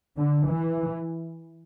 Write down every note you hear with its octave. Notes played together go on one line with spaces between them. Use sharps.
D3
E3